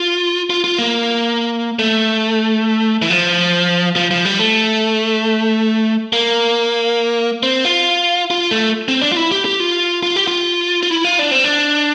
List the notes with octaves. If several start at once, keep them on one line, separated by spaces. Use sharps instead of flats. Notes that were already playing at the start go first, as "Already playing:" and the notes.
Already playing: F4
F4
F4
A#3
A3
E3
F3
F3
F3
G3
A3
A#3
C4
F4
F4
A3
C4
D4
F4
E4
G4
G4
F4
F4
G4
F4
F4
E4
F4
D4
C4
D4